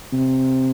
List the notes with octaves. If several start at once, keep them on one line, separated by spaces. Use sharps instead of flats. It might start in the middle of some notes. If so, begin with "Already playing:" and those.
C3